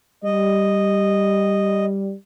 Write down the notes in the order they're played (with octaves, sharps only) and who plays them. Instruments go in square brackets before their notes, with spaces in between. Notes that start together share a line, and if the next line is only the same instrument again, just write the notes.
[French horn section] G3 [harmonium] D#5